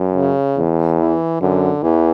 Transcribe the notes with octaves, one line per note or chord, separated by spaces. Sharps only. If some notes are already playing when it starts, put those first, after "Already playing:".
Already playing: F#2
C#3
E2
E3
F#2 D3
E2 E3